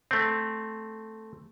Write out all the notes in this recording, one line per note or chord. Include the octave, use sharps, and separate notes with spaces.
A3 C4